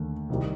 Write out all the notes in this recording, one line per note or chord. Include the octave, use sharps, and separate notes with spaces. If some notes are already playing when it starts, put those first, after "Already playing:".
Already playing: D#2 D3 A3
C2 C3 D#3 G3